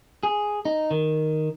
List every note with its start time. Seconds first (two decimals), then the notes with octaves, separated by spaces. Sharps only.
0.23 G#4
0.65 D#4
0.91 D#3